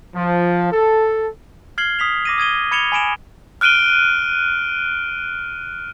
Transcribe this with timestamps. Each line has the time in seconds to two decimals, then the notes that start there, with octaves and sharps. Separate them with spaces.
0.15 F3
0.72 A4
1.78 F6 G#6 C7 F#7 G7
1.99 D#6 B6 F7
2.25 D6 A#6 D#7
2.38 D#6 G#6 D#7 G7
2.71 B5 G#6 C#7 E7 F7 G7
2.92 G#5 B5 D7 E7
3.61 F6 F#6 D7 D#7 G7